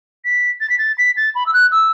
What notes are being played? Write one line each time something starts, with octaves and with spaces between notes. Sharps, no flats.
B6
A6
B6
A6
B6
A6
B5
E6
F#6
E6